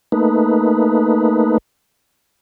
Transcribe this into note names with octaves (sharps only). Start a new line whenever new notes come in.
A3 A#3 D#4 B4